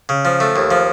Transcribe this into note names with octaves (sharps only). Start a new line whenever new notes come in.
C#3
F3
A3
D#2
F3